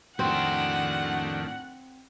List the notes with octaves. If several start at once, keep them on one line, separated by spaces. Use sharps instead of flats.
F2 A2 D#3 C4 D4 F#4 F#5